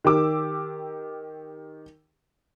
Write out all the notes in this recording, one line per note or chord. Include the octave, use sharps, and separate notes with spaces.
D#3 G4 D6 E6